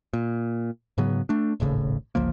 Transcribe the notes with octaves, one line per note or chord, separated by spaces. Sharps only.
A#2
G#2 C#3 F#3 B3
A3 D4
D#1 G#1 A2 C#3
G1 C#2 F3 A#3